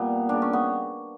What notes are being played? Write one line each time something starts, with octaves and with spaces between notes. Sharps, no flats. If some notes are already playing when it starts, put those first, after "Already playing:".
Already playing: A#2 G3 B3
C#3 G3 D4
C#4
B3